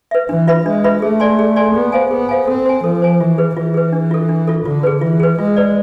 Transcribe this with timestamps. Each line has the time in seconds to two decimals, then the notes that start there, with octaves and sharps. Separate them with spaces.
0.11 B4 E5
0.29 E3 D4
0.47 F4 B4 E5 B5
0.66 G#3 D4
0.84 F4 B4 E5 B5
1.02 A3 G#4
1.20 D5 G#5 C6
1.39 G#4
1.56 D5 G#5 C6
1.75 B3 G#4
1.92 C5 F5 G#5
2.11 B3 G#4
2.29 C5 F5 G#5
2.47 C4 A4
2.66 C5 G#5
2.84 F3 A4
3.02 C5 G#5
3.20 E3 F4
3.38 G#4 B4
3.57 E3 F4
3.74 G#4 B4
3.92 D4
4.11 F4 A4
4.29 D4
4.48 F4 A4
4.65 D3 F4
4.83 G#4 B4
5.01 E3 F4
5.20 G#4 B4
5.39 G#3 F4
5.56 B4 D5